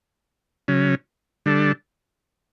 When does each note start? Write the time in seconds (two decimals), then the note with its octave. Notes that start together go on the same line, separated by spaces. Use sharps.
0.68 C#3 F#3 C#4
1.46 D3 G3 D4 A4